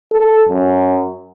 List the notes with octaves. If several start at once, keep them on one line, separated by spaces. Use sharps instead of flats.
A4
F#2